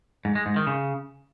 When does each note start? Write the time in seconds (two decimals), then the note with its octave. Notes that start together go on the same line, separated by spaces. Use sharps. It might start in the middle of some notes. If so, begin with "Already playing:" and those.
0.25 G#2
0.35 G#3
0.46 G#2
0.56 D#3
0.67 C#3